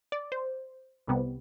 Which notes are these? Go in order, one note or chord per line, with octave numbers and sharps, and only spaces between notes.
D5
C5
C2 C3 G3 B3